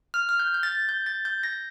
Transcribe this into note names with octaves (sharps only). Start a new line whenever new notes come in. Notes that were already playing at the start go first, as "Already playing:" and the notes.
F6
F6
G6
G6
A6
G6
A6
G6
A#6